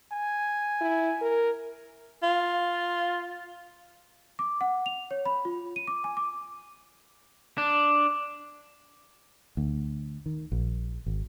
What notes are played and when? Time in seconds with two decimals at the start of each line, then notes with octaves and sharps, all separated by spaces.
0.12 G#5
0.81 E4
1.21 A#4
2.23 F4
4.39 D6
4.61 F#5
4.86 F7
5.11 C#5
5.26 B5
5.45 F4
5.76 D#7
5.87 D6
6.04 G#5
6.17 D6
7.58 D4
9.57 D2
10.26 D#3
10.52 A#1
11.06 G#1